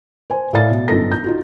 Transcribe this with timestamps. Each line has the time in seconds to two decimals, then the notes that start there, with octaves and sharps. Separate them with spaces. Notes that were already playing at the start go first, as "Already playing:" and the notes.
0.30 C5 G#5
0.53 A2 A4 D5 F5 A6
0.71 B2
0.88 G1 F#2 D#4 F4 A4 A#6
1.11 G6
1.24 D#4 F4 F#4